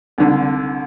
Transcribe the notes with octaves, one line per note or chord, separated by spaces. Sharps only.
C2 D3